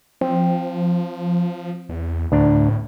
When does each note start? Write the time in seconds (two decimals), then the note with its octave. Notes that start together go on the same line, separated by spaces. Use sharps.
0.21 F3 C4
1.89 E2
2.32 D2 A2 D4 A#5